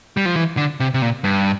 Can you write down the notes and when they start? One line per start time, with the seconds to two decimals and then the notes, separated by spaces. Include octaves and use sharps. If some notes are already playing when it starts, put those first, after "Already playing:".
0.17 G3
0.26 F3
0.36 E3
0.57 D3
0.80 C3
0.94 C3
1.02 A#2
1.24 G2